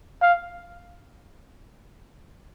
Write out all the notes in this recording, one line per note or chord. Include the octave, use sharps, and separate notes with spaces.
F5